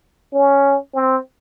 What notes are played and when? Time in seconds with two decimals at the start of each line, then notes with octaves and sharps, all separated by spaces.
0.33 C#4
0.94 C4